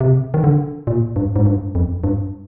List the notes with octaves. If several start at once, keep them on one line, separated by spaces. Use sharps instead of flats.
C3
D#3
D3
A#2
G2
G#2
G2
F2
G2